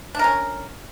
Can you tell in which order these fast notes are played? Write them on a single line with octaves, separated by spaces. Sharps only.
D4 A#4 C#4